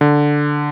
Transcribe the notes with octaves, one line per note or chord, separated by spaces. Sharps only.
D3